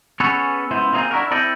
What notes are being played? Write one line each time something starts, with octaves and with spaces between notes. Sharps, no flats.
B3 C#4 G#4 A4 B4 C#5
C#2 B3 E4 C5
A#3 C4 D#4 F4 G#4
D4 E4 F#4 A#4
C4 E4 A4 D5 D#5 G5